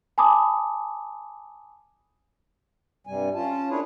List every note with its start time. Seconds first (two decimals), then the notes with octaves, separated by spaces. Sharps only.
0.18 G#5 A5 B5 D6 D#6
3.07 G2 C3 G3 G#5
3.35 C#4 F4 A5
3.70 A#3 D4 E4 G#4 B4 C#5